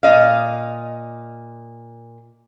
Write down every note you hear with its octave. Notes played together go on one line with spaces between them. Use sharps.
A#2 D#5 F5